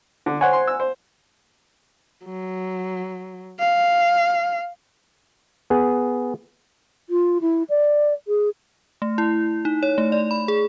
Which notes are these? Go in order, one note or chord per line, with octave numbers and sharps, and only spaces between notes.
D3
C5 C#5 F#5 G#5
C6
E6
C5
F#3
F5
B3 G#4
F4
E4
D5
G#4
A3
E4
D#4
C#5
A3
D5
B5
G#4